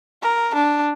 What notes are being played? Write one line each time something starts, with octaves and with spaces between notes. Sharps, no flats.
A#4
D4